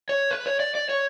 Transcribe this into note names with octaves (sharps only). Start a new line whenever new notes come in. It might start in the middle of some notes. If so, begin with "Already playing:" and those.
C#5
B4
C#5
D5
D5
C#5